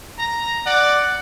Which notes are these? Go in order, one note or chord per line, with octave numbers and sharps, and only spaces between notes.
A#5
D5 F#5